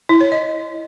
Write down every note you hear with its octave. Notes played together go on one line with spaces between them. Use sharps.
E4
C#5
D#5